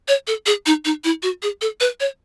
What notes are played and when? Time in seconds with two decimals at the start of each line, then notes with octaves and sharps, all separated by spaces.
0.08 C#5
0.27 A4
0.46 G#4
0.66 D#4
0.85 D#4
1.04 E4
1.23 F#4
1.43 G#4
1.61 A4
1.80 B4
2.00 C#5